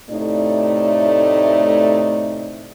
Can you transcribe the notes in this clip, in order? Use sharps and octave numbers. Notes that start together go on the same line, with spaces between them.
A2 C3 A3 D#4 D5